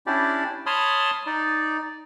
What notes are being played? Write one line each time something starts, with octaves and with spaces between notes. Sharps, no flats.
C#4 D4 E4 G4 D5
C#5 A5 B5 C6 D#6 F6
D#4 D5